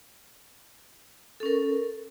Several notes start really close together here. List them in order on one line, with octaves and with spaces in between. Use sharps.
A4 C#4 A#4